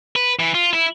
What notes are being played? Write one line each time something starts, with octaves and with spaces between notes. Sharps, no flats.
B4
E3
F4
E4